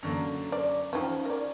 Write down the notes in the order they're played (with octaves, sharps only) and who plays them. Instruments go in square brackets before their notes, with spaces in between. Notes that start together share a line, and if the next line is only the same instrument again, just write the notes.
[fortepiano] F#2 D3 A#3
[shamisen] D5
[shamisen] F3 D#4 [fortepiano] C#4 C5 G5
[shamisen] A#4 D5